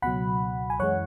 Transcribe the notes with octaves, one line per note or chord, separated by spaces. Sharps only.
C#2 B2 F#3 F#5 B5
G#5
F#2 E3 G#3 C#5 F#5